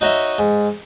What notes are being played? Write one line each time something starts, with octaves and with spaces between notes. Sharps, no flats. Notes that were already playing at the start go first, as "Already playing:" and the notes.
D#4 F#4 C#5 D#5 E5
G#2